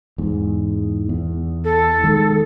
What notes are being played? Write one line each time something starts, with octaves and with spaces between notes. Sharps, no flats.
E2 G#2
E2
A4
D#3 G#3